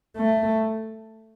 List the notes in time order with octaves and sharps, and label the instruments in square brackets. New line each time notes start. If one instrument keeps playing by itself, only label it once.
[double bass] A3